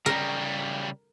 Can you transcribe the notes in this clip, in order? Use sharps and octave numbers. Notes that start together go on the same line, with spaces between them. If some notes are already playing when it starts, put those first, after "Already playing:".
C#3 G3 A#4